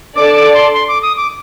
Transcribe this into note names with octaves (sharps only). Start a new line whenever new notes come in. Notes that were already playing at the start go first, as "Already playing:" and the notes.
D4 A4 D5 A5 D6
D6
C6
C6
D6
D#6
D6